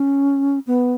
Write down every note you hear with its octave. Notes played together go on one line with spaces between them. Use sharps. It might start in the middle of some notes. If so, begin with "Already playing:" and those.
Already playing: C#4
B3